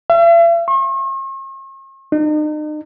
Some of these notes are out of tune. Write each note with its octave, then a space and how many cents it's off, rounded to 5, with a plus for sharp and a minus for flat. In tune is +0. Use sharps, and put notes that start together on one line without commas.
E5 +45
C#6 -45
D#4 -40